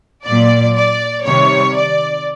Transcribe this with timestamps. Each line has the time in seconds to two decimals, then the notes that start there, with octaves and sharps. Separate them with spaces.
0.24 A#2 F#3 D5
0.75 D5
1.25 C3 D#3 G3 C#5
1.75 D5